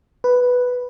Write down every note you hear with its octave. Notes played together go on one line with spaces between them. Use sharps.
B4